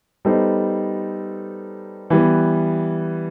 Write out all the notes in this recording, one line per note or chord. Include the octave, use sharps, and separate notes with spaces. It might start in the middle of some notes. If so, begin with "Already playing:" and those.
G3 B3 D#4 A4 C5
E3 G3 B3